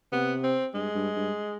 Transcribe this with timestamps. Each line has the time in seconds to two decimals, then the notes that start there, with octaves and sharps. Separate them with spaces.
0.12 C3 B3
0.44 C4
0.74 G2 G#3
0.95 G2
1.16 G2